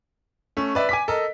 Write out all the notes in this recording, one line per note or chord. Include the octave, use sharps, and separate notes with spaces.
A3 C#4
B4 D5 E5
G#5 D6 B6
A4 A#4 D#5